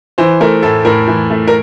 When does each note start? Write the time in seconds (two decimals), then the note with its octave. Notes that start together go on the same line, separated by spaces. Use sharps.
0.18 E3 C5
0.40 A3 A#4
0.63 A2 A4
0.85 A2 A#4
1.08 E3
1.30 A3
1.48 A#4